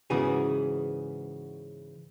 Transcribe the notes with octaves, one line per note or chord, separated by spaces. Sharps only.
G#2 C#3 E3 B3 F#4 G#4